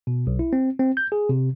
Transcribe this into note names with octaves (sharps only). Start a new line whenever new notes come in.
B2
B1
E4
C4
C4
G6
G#4
C3